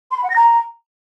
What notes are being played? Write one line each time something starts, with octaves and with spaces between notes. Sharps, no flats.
C6
B5
F#5
A#6
A#5